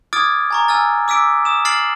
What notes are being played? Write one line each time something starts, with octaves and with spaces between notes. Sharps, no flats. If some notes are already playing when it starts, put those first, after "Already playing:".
D6 D#6 F6 G#6 A6 D7
G#5 A#5 C#6
G#5 E6 F6 A6
D6 E6 B6 D7
D#6 E7
F6 A6 C7 D7 F#7